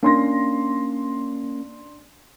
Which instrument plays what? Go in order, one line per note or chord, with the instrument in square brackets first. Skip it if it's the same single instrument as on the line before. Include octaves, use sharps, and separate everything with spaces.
[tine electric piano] A#3 C#4 [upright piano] D4 C6 A#6